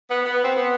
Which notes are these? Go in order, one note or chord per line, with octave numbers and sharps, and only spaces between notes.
B3
B3
C4
B3